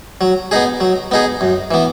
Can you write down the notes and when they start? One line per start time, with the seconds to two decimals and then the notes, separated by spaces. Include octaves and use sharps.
0.21 F#3
0.51 B3 D#4 G#4
0.80 F#3
1.11 B3 D#4 G#4
1.41 F#2
1.71 E3 B3